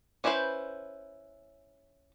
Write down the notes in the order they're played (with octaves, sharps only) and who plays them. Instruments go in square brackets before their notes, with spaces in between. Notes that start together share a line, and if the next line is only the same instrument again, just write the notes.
[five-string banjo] C#4 D4 E4 B4 C5